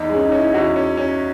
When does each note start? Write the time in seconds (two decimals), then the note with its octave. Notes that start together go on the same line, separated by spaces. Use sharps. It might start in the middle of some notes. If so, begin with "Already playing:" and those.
Already playing: E2 D#4
0.09 G#3
0.15 C#4
0.21 D#4
0.32 C#4
0.38 E4
0.54 E2 F#4
0.76 C#4
0.98 C#4